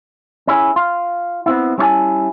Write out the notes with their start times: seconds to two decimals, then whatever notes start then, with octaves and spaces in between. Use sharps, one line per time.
0.47 C#4 E4 G#4
0.76 F4
1.46 B3 C4 E4
1.78 G3 C#4 E4 C#5 G#5 A5